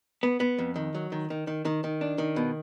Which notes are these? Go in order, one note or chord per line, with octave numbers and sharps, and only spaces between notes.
B3
B3
F2
D#3
F#3
D#3
D#3
D#3
D#3
D#3
D4
D#3
B2